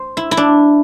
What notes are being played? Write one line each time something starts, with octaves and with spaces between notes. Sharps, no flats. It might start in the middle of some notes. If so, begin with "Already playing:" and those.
Already playing: C5
E4
E4
D4